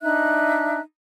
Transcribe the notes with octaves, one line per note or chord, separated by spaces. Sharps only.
D4 D#4 E5 F#6